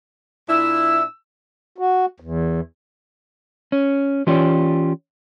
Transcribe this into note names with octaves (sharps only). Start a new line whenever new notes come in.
A#2 D4 E4 E6
F#4
E2
C#4
E3 C#4 F4 G4 C#5 D5